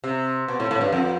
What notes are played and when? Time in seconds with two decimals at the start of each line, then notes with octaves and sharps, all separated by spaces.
0.04 C3
0.48 B2
0.60 A2
0.71 A2
0.81 G2
0.92 F2